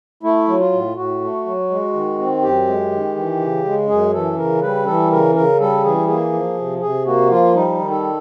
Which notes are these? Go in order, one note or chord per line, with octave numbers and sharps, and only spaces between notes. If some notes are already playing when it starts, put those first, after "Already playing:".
A3 E4
F#3
F4
A2
A2 F#4
A3
F#3
G#3
D#3
C4
F#2 G4
G#3
D#3
E3
C#3
G#3
F#2 G#4
E3 A4
C#3 A#4
G3 B4
E3 A4
C#3 A#4
C#3 A#4
G3 A4
E3 G#4
A#3 G#4
F3
C3
C3 G#4
A#3 F#4
F3 F4
G3 D#4
D#3
A4